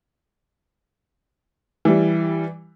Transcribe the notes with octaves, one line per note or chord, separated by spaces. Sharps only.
E3 G3